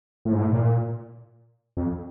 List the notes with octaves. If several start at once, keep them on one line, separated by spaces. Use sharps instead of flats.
A2
G#2
A2
A#2
F2